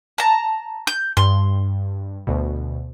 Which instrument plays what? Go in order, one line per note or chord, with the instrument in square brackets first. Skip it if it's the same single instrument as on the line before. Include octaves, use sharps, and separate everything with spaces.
[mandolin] A5 A#5
G6
[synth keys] G2 [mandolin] C6
[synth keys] D2 B2